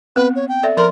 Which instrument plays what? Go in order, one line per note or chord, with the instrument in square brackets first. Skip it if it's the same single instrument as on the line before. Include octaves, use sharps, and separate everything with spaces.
[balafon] B3 C4 [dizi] B4
[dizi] C#5
G5
[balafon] A4 D5 E5
[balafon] F3 D5 C6 [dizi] A#4